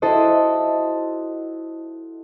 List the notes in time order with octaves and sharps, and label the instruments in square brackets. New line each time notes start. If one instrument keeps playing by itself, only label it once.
[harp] E4 F#4 A4 C5 D#5